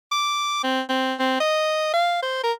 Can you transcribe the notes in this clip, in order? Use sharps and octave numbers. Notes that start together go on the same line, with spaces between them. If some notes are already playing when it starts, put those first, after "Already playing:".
D6
C4
C4
C4
D#5
F5
C5
A#4